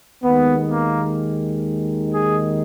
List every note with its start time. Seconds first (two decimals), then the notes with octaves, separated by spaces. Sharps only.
0.24 D#2 D#3 G#3 B3
0.72 A#3
2.14 G#4